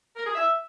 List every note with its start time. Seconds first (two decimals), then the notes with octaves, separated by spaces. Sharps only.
0.16 A#4
0.25 G#4
0.35 E5